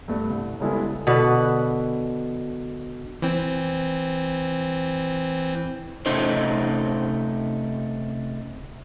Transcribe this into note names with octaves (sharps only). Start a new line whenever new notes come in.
G2 A3 B3
C2
C#3 G3 G#3 B3 E4 A4
B2 D3 B4 F#5
E3 C4
C3 A3 C#4 D#4 C5